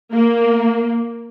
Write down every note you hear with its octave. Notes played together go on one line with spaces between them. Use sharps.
A#3